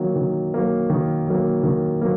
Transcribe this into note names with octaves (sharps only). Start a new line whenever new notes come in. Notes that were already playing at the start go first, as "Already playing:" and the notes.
Already playing: D#3 F#3 A#3
D#3
F#3 A#3
D#3
F#3 A#3
D#3
F#3 A#3